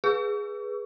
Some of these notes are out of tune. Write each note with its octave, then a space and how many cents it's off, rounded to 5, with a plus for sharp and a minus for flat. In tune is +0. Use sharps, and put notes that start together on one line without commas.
G#4 +0 B4 -15